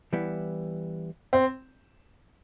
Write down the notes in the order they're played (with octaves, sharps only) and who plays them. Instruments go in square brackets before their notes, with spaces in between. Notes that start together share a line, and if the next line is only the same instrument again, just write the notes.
[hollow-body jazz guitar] E3 G3 B3 E4
[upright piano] C4